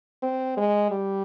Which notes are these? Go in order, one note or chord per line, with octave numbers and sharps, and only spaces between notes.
C4
G#3
G3